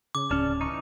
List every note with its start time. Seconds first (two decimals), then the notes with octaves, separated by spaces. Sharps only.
0.15 C#3 D6
0.31 D1 C#4 D5 A5 F6
0.61 E3 D#4 C#6